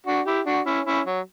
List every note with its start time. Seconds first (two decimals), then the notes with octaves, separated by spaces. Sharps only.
0.06 D4 F#4
0.26 E4 G4
0.46 D4 F#4
0.66 C#4 E4
0.86 C#4 E4
1.06 F#3